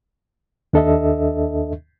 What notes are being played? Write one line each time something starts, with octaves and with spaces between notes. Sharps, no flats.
D#2 D4 A4 D#5 E5